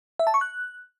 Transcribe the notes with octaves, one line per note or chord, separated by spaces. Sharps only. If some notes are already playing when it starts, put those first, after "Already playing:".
E5
A5
C#6
F#6